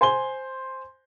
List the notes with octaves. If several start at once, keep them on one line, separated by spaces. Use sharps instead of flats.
C5 G#5 C6 G7